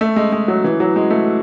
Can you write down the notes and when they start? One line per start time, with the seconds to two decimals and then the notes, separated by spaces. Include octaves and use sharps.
0.01 A3
0.16 G#3
0.32 G#3
0.48 F#3
0.64 E3
0.80 F#3
0.96 G#3
1.10 A3